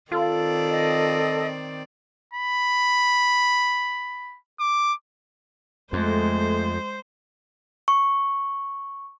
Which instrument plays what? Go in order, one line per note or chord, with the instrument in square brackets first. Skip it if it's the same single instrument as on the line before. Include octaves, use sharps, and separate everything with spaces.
[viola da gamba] D#3 C4 D5 [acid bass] F4 [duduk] A4
[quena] D#5
[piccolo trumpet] B5
D6
[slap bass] F2 [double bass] G#3 [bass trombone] A3 [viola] C5
[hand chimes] C#6